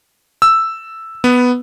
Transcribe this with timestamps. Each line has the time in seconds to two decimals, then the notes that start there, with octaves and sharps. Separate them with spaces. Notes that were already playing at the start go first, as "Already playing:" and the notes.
0.42 E6
1.24 B3